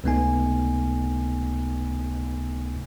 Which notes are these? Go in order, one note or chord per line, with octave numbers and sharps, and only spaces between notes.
C#2 C3 A3 B3 D#4 G#5